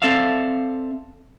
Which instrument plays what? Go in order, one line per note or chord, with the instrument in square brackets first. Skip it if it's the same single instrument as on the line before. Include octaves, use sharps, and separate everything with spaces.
[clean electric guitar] C4 A4 D5 E5 F5